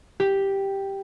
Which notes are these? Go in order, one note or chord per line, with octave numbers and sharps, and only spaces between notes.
G4